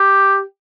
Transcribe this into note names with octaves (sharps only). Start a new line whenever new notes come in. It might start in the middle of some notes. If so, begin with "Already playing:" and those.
Already playing: G4